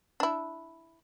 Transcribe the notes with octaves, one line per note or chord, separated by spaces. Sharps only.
D4 E4